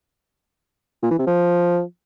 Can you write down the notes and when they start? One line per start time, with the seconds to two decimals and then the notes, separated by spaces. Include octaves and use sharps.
1.03 A#2
1.11 E3
1.19 C3
1.27 F3